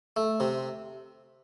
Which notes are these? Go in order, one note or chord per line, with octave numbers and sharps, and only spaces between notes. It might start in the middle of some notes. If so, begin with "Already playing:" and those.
A3
C3